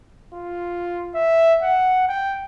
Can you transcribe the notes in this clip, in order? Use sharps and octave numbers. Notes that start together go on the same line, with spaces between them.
F4
E5
F#5
G5